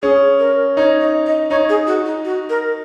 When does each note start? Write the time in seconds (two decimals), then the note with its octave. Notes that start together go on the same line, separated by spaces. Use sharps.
0.02 C#4 G#4
0.39 A#4
0.77 D#4 C#5
1.01 D#5
1.26 D#5
1.51 D#4 C#5
1.69 G#4
1.87 F#4
2.06 D#4
2.25 F#4
2.50 A#4